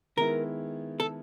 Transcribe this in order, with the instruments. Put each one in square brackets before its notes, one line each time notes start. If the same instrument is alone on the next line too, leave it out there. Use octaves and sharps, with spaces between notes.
[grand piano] D#3 G#3 B3 E4 [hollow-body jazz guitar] A#4
[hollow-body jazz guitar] A4